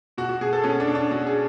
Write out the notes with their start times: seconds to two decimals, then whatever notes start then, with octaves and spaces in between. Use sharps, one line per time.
0.18 B2 F#4
0.29 F#4
0.41 B2 G#4
0.53 A4
0.64 B2 C#4
0.80 D4
0.87 B2
0.95 D4
1.11 B2 F#4
1.27 G#4